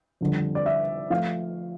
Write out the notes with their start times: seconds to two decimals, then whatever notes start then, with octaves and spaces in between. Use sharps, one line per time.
0.21 F2 D3 G3
0.55 D5
0.66 E5
1.10 F3 A3 F5